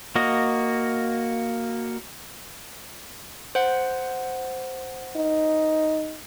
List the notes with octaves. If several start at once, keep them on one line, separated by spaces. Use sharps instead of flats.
A#3 F#4 D#5
C5 F#5
D#4